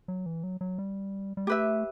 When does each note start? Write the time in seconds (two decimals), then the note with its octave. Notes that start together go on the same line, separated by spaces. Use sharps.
0.08 F#3
0.26 E3
0.43 F#3
0.61 F#3
0.79 G3
1.37 G3
1.47 A3 G4 B4 E5